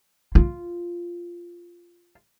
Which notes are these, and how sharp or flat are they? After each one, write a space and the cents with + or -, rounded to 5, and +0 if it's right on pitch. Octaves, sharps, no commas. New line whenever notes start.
F4 -5